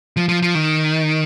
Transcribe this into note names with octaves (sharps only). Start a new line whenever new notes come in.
F3
F3
F3
D#3